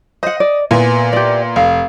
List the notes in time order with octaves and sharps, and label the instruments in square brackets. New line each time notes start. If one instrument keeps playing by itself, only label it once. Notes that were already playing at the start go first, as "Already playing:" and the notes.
[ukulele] C5 F#5 [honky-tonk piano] D#5
[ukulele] D5
[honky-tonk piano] A#2 B3 E4 [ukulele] G#5
[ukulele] G4 D5
[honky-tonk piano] F1 [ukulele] F5